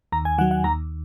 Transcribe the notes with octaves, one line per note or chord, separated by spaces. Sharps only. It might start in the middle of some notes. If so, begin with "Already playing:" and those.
D#2 A#5
G#5
D#3 F#3 F#5
F#5
D#2 A#5